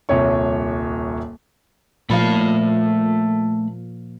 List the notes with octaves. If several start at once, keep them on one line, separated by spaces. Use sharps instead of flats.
D#1 C2 C#5 C#6
A#2 F3 A3 F5 B5